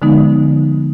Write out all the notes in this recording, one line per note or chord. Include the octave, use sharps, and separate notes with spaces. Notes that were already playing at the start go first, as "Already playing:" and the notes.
D3 F3 G#3 B3 D#4